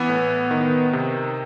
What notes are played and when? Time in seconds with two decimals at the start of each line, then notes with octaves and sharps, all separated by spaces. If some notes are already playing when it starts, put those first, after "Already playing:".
Already playing: E3 B3
0.09 A2
0.51 D#3
0.93 C3